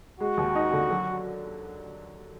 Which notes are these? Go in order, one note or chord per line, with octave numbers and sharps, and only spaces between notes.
G#3 F#4
D#2
D#4
D3
F#3